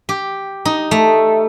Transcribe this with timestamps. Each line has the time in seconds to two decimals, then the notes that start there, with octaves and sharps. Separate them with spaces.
0.09 G4
0.65 D#4
0.91 A3